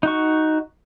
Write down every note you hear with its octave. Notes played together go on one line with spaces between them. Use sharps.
D#4 F#4 C#6